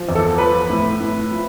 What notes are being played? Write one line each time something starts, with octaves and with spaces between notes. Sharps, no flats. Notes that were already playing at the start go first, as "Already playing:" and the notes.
Already playing: F3
E2
A4
F3 B4
A2
A2
F3